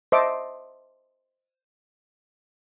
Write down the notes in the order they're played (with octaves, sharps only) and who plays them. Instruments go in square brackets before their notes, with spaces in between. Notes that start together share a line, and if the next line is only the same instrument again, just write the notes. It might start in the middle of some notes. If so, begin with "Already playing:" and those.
[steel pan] C5 D#5 E5 A5 D6